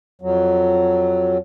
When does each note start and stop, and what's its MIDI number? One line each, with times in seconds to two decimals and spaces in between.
0.22 1.38 41
0.22 1.38 54